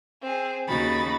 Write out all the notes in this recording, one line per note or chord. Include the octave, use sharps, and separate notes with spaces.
C4 G#4
D#2 C#3 D#4 F#4 B5 A6